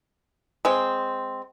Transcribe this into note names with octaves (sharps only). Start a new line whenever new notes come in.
G#3 C4